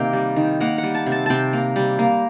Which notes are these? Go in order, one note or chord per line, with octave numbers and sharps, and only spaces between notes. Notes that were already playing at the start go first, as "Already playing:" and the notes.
Already playing: C3 D#3 A#3 G5
G3
D#3
A#3 F#5
F#5
G3
A5
C3
A5
C3 G5 A5
A#3
G3
A#3